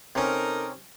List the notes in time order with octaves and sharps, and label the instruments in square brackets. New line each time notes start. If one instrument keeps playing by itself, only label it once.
[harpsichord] C3 C#4 [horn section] D#4 A4 A#4